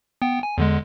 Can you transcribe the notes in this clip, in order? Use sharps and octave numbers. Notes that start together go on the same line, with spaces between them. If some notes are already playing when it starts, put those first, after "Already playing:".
B3 G5
G#5
E2 D3 G#3